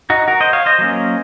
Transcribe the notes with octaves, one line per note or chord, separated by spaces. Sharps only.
D#4 F#4
F#4 A#4
C5 D#5
C#5 F5
C5 D#5
F#3 A#3 C#4